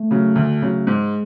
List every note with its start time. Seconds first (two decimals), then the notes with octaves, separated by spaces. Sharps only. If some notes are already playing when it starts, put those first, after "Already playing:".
Already playing: A3
0.11 C#3 F#3
0.36 D2
0.62 C#3 F#3
0.87 G#2 G#3